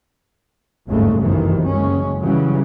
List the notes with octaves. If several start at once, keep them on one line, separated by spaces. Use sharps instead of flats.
G1 D#2 G#2 C#3 G#3 A3
G1 C2 F#2 C3 D#3 E3
F#1 G#3 C#4
C#3 E3 F#3 G3